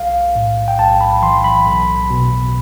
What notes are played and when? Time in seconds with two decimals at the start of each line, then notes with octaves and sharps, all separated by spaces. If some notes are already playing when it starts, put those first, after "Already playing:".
Already playing: B1 F5
0.35 A2
0.68 G5
0.79 B1 A5
1.01 B5
1.22 E3 C6
1.44 B5
1.66 B1
2.10 B2